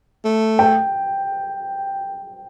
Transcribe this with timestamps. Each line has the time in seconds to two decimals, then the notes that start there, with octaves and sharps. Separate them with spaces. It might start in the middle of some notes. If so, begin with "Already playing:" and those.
0.25 A3
0.59 G5